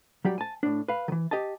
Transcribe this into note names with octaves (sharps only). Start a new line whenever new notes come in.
F#3 G3 G4 G5
G#5 A5
A2 D4
B4 F5
D#3 E3
G4 D#5 G#5 A5